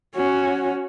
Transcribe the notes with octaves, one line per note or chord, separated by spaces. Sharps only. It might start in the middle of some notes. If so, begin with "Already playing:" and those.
C#4 F#4